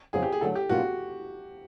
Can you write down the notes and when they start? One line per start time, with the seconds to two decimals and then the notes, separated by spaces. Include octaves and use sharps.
0.13 F2 C#3 F#3 B3 D#4 G#4
0.23 G4
0.32 G#4
0.41 D3 F#3 A3 A4
0.56 G4
0.69 B2 F#3 A#3 D4 F4 F#4